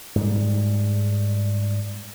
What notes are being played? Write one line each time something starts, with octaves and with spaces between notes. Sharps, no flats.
G#2 G3